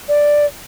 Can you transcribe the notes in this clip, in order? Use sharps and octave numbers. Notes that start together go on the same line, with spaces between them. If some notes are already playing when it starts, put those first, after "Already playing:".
D5